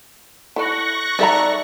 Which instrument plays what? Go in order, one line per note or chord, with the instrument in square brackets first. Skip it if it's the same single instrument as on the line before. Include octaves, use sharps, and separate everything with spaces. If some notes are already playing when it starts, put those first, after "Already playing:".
[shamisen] E4 A4 D5 [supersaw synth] C#6 F#6 A#6
[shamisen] D#4 A4 C5 [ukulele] D5 E5 A#5